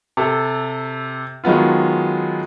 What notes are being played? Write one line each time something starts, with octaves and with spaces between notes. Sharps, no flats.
C3 A4
D#3 F#3 G#3 B3 F4